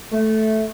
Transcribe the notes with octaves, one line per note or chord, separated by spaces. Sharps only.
A3